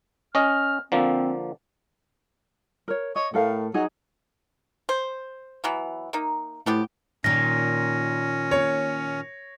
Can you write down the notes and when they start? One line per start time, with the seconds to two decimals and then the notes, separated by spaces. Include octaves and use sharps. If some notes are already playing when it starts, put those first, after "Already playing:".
0.35 C#4 D#5 F6
0.92 D3 F3 A#3 C4
2.88 A#4 C#5
3.16 C#5 D#5
3.34 A2 A4 A#4 F5
3.74 F#3 D#4 G#4
4.89 C5
5.64 E3 F#3 B3
6.13 A#3 D#4
6.66 A2 F3 B3 G4
7.24 A#2 D#3 C#4 A#6
8.51 C#5